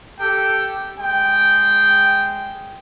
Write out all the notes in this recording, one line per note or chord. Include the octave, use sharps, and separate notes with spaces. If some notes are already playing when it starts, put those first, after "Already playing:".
G4 A4 G5
G#3 G5